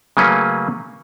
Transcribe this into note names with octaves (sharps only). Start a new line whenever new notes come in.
C#3 F#3 A3 A#3 C#4 B4